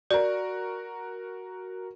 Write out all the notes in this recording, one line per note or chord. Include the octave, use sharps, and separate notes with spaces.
F#4 A#4 D5